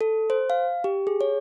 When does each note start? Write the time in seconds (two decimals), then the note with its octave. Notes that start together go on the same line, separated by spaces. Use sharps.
0.01 A4
0.30 C5
0.50 F5
0.84 G4
1.07 G#4
1.21 C#5